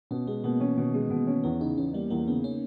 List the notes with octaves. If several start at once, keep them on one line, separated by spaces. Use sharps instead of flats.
B2 C#4
G#3 B3
B2 A#3
E3 C#4
B2 D#3
E3 G#3
B2 D#3
D#3 C#4
E2 B3
C#3 D#4
E2 C#4
G3 A#3
E2 A#3
C#3 B3
C#4